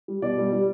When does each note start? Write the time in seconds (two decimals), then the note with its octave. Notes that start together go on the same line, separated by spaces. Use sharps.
0.08 G3
0.22 B2 D5
0.38 G3
0.53 G3